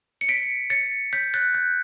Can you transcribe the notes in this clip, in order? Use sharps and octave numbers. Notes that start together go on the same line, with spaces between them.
C#7
B6 D7
A6 C#7
G6 B6
F#6 A6
G6